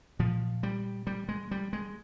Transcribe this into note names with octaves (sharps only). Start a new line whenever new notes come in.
A#2 F3
G3
G3
G#3
G3
G#3